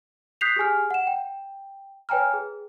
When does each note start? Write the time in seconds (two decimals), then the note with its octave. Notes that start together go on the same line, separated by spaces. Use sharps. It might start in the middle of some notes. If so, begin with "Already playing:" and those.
0.41 D#6 F#6 G6 B6 C7 F7
0.56 G4 G#4 G#5 F6
0.91 F#5 E7
1.07 G5
2.09 B4 C#5 G5 G#5 A#5 F6
2.33 G#4